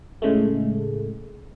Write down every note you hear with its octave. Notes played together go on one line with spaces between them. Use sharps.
A2 C#3 G#3 A3